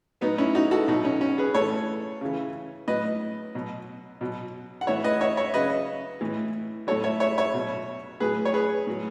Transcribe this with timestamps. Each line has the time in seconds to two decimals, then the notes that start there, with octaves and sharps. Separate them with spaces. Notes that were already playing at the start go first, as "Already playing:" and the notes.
0.21 A2 F#3 B3 D#4
0.38 C#4 E4
0.55 D#4 F#4
0.71 F#4 A4
0.88 B2 F#3 D#4 F#4
1.05 C#4
1.21 C#4
1.38 G#4 B4
1.54 A2 E3 A4 C#5
2.21 C#3 E3
2.88 A2 F#3 B4 D#5
3.55 B2 F#3
4.21 B2 F#3
4.81 F#5
4.87 A2 E3 C#5 E5
5.04 B4 D#5
5.21 C#5 E5
5.37 C#5 E5
5.54 C#3 F#3 B4 D#5
6.21 A2 E3
6.87 A2 F#3 A4 C#5
7.04 C#5 E5
7.20 C#5 E5
7.38 C#5 E5
7.54 B2 F#3
8.20 A2 F#3 G#4 B4
8.45 C#5
8.54 G#4 B4
8.87 A2 F#3